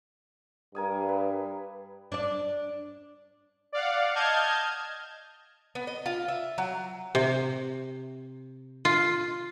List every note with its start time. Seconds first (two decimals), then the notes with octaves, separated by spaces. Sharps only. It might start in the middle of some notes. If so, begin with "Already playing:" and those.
0.75 G2 A#4 G#5 D#6
1.09 B4
2.12 D4 D5
3.72 D5 F5 F#5
4.15 D#5 A5 F6 G6 G#6
5.75 B3
5.87 D#5
6.06 F4
6.28 E5
6.58 F#3
7.15 C3
8.85 F4